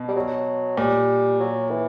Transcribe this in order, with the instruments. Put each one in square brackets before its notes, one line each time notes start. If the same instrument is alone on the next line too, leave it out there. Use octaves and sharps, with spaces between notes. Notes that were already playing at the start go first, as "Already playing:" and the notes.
Already playing: [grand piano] B2
[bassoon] G3
F#3
[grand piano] A#2 [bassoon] G3
[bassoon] F#3
E3